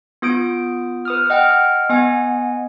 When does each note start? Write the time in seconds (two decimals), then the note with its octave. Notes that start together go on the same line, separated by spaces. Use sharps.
0.22 B3 F4 D#6 G6 D7
1.05 B4 D#6 F6
1.30 D#5 F#5 G5 F6
1.90 B3 D#5 F#5 G#5